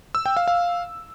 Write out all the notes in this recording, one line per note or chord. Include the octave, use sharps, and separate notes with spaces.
E6
G5
F5
F5